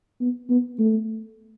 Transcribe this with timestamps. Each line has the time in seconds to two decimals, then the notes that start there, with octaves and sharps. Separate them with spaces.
0.21 B3
0.49 B3
0.79 A3